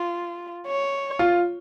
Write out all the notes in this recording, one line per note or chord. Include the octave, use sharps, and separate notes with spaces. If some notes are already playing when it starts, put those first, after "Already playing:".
Already playing: F4
C#5
F4